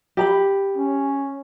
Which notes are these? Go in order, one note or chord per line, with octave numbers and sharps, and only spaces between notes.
G4 A#5 B5
C#4